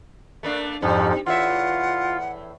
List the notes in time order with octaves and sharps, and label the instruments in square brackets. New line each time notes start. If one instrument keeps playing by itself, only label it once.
[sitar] A3 A#3 D4
[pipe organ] F2 G#2 F3 [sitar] G3
[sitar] E2 A2 E5 [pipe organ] F4 [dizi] F#5